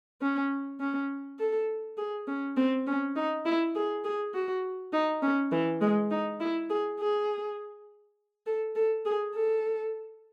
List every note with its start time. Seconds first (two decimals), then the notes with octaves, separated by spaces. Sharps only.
0.22 C#4
0.80 C#4
1.39 A4
1.98 G#4
2.28 C#4
2.57 C4
2.87 C#4
3.16 D#4
3.46 E4
3.75 G#4
4.04 G#4
4.34 F#4
4.93 D#4
5.22 C#4
5.52 E3
5.81 G#3
6.11 D#4
6.40 E4
6.69 G#4
6.99 G#4
8.46 A4
8.76 A4
9.06 G#4
9.35 A4